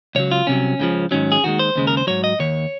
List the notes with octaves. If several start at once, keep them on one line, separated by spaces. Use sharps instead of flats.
C#2 C#3 F#3 C#5
F4
C2 C3 F#3 C#4
C#2 C#3 F3
G#2 D#3 F#3 C#4
G#4
D#2 D#3 G#3 F#4
C5
D#2 C#3 G#3
A#4
C5
G#2 F#3 C#5
D#5
D#2 D#3 C#5